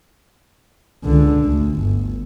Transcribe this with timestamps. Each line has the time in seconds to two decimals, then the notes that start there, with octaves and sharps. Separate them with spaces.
1.04 C#2 D3
1.44 D2
1.77 G1